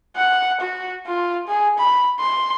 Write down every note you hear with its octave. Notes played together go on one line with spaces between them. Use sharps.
F#5
F#4
F4
G#4
B5
C6